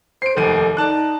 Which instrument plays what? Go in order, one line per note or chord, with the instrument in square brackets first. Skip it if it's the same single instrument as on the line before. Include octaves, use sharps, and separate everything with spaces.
[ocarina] C5 [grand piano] C7 D7
[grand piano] F1 D#2 D#7 [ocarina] A4
[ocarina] D#4 [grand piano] D5 A5 F#6